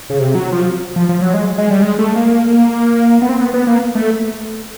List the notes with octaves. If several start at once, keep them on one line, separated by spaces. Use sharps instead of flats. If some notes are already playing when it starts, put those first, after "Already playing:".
C#3
C3
F#3
F3
F3
F3
F#3
G#3
G#3
G3
G#3
A3
A#3
B3
C4
B3
B3
A#3
A3